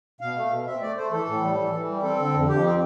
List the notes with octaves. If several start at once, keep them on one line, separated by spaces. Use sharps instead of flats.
B2 F5
A3
B2
C4 E5
A3 D5
A3 C5
E3 A4
A2
G3
E3
E3
G3
C4 A4
D3
F2
F2 G4
C4